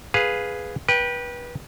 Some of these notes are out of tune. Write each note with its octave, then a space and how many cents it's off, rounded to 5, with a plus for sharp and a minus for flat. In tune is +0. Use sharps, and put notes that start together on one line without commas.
G#4 +0 B4 +0 F5 +10
B4 -25 G5 +0